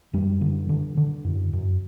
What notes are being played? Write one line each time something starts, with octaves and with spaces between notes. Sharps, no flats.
F#2 G3
D3
D3
D3
F#2
F#2